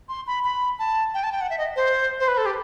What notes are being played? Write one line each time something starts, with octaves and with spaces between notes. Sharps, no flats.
C6
B5
B5
A5
G5
A5
G5
F#5
E5
D#5
C5
C5
B4
A4
G4